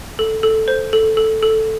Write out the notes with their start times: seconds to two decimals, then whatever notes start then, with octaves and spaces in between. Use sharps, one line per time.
0.19 A4
0.43 A4
0.68 C5
0.93 A4
1.17 A4
1.43 A4